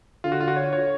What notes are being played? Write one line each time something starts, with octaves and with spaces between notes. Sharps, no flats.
D3 F4
F#4
F4
F#4
C#5
C#5